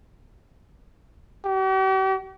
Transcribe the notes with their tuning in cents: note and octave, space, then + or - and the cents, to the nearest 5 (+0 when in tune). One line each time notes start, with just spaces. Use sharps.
G4 -45